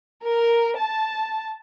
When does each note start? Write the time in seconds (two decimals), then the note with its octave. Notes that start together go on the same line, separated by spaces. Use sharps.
0.22 A#4
0.77 A5